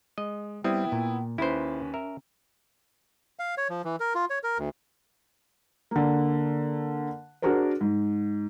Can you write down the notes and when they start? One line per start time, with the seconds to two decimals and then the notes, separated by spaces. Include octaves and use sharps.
0.18 G#3 D#5
0.64 G3 B3 C4 E4 G5 D#6
0.92 A#2
1.38 D#2 C#4 E4 B4 C5
1.94 A#4 E5
3.39 F5
3.58 C#5
3.70 F3
3.85 E3
4.00 A#4
4.15 F4
4.30 C#5
4.44 A#4
4.59 D2
5.91 D3 A#3
7.42 D4 F#4 G#4 A#4 C5
7.81 G#2